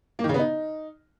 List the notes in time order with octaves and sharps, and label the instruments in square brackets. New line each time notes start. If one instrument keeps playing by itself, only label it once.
[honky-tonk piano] A#3
D#3
C#3
B3
D#4